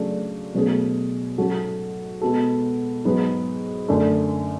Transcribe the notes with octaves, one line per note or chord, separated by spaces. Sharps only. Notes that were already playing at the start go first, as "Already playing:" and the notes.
Already playing: C#3 F#3 A3 D4
B2 F#3 A3 C#4 G#4
G#2 F#3 C#4 F#4 A4
B2 G#3 B3 F#4 A4
G#2 F#3 B3
F#2 D3 A3 D4